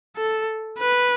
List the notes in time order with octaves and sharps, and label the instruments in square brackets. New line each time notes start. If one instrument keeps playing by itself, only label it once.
[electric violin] A4
B4